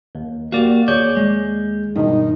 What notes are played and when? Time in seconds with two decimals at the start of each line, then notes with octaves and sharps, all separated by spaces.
0.15 D#2
0.52 A#3 F#4 G4 D5 F5
0.88 D#2 G#4 C#5 D5 G6
1.17 G#3
1.96 G2 B2 D#3 D#4